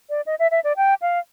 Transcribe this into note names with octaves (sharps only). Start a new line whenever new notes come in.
D5
D#5
E5
E5
D5
G5
F5